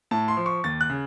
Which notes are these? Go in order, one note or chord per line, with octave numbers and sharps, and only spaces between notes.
A2 A5
C6
F3
C#6
D#2 A6
F#6
C#3